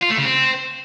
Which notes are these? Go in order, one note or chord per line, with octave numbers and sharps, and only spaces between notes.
F4
A3
C#3
C4